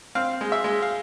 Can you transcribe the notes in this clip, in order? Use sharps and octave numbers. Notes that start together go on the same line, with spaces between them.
C4 F5
G#3
E5
G#3
F5